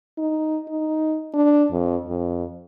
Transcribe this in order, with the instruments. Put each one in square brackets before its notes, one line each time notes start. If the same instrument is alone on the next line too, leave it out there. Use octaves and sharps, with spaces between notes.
[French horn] D#4
D#4
D4
F2
F2